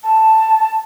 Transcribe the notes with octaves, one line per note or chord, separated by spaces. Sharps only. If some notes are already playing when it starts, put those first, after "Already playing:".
A5